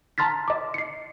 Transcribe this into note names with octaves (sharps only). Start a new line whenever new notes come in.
A5 A#5 C6 F6 A6 B6
D#5 D6
C7 C#7